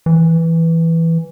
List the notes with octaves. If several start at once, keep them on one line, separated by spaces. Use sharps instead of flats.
E3